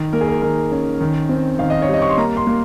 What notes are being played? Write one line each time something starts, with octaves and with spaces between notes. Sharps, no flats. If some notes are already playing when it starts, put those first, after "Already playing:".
Already playing: D#3
A#3 A#4
G#4
A#4
D#3 A#4
C#4
D#3
C4
D#3 F5
D#5
C#5
G3 D#5
C#6
C6
A#3 A#5
C6
A#3